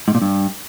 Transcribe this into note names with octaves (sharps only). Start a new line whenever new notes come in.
G#2
A#2
G2